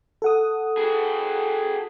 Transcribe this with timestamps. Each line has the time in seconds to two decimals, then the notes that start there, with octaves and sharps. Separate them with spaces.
0.22 A4 F#5 D#6
0.77 F#4 G#4